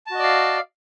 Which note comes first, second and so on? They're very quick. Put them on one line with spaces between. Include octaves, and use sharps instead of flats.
A5 F#4 D#5 D5 F5